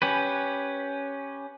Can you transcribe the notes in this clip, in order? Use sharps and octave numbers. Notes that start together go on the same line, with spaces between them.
C#4 G4 B4